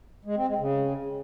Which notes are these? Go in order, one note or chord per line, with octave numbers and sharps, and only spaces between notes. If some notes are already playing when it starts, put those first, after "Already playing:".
G#3
C4
G#3
C#3